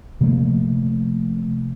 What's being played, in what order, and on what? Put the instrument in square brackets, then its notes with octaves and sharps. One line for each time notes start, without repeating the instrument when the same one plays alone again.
[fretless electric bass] C3 F3 A3 A#3